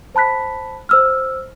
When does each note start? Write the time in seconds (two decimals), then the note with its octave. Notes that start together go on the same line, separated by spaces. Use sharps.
0.15 C5 A5 B5 F#6 B6
0.89 C5 E6 F6